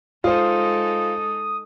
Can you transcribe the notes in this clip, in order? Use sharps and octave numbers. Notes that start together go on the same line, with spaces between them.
G#3 D#4 F4 A4 C5 D#6